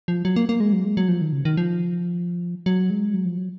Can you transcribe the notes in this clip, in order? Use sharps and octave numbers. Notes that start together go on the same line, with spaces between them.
F3
F#3
A#3
A#3
G#3
F#3
G#3
F#3
F3
D#3
C#3
D#3
F3
F#3
G#3
F#3
F3
F#3